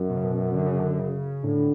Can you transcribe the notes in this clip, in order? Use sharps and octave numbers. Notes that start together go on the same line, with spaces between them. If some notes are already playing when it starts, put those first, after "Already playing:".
Already playing: F#2
B2
C#3
B2
D3
C#3
D3
C#3
A2 D3